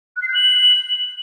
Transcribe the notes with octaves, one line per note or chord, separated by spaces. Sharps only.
F#6
C7
G6
F#7